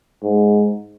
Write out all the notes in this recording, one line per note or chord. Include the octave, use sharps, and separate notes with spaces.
G#2